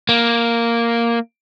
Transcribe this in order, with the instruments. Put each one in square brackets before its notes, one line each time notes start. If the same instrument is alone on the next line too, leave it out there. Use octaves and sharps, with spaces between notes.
[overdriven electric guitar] A#3